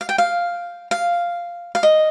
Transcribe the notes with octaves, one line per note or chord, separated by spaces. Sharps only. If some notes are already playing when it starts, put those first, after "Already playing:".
F5
G5
F5
F5
F5
D#5